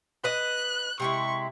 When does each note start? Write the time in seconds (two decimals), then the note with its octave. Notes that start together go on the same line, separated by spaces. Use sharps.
0.24 B4 D#5 F#6
1.00 C3 G#3 E4 C#6